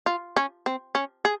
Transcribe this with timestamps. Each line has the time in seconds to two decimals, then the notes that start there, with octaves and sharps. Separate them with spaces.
0.06 F4
0.36 C#4
0.66 C4
0.95 C#4
1.25 G#4